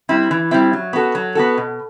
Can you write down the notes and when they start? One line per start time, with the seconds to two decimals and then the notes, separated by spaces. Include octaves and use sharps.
0.09 G3 C4 E4
0.31 E3
0.51 G3 C4 E4
0.73 F#3
0.93 B3 F#4 A4
1.15 F#3
1.35 B3 F#4 A4
1.58 B2